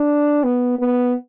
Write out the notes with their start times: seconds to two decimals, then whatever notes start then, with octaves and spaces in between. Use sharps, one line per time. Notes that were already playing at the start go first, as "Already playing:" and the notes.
Already playing: D4
0.44 B3
0.79 B3